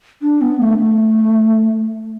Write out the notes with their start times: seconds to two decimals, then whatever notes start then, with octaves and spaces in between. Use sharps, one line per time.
0.22 D4
0.41 B3
0.60 A3
0.79 A3